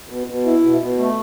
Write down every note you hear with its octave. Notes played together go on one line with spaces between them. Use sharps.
B2
B2
E4
B2
B2
A3